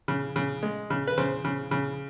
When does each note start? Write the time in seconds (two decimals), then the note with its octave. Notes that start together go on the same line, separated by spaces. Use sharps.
0.08 C#3
0.36 C#3
0.63 G#3
0.90 C#3
1.07 B4
1.18 C#3 C5
1.45 C#3
1.71 C#3